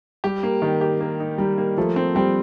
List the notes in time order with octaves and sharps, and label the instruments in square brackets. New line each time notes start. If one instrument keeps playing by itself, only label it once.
[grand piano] G3 [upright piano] G4
[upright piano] A#3
D#3
G4
A#3
D#4
[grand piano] G3 [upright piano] D#4
[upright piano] A#3
[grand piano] F3 [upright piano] A3
[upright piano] C4
[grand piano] G3 [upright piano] C4